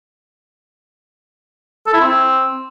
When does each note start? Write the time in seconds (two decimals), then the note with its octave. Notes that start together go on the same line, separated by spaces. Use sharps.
1.86 A4
1.94 E4
2.01 C4